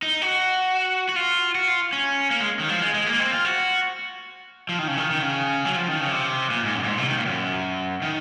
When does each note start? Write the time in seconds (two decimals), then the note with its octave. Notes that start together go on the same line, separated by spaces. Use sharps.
0.02 D#4
0.22 F#4
1.09 F#4
1.16 F4
1.55 F#4
1.68 F4
1.93 C#4
2.31 A#3
2.40 G#3
2.59 D#3
2.69 F3
2.81 G#3
2.94 G#3
3.06 A#3
3.20 C4
3.32 F4
3.45 F#4
4.69 F3
4.79 D#3
4.88 C#3
4.97 D#3
5.10 D#3
5.22 C#3
5.65 F#3
5.76 F3
5.88 D#3
6.00 C#3
6.12 C3
6.50 A#2
6.62 G#2
6.75 F#2
6.83 A#2
6.88 G#2
6.98 C3
7.07 D#3
7.16 A#2
7.26 F#2
8.02 D#3